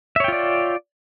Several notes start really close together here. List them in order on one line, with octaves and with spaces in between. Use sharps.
E5 C#5 G5 F4 D5